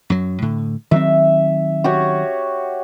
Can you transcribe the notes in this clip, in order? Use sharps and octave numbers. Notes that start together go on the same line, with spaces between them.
F#2 F#3
A2 D3
D#3 F#3 C4 E5
F#4 G4 C#5